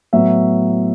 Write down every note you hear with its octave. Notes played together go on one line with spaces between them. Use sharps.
A2 F#3 B3 E5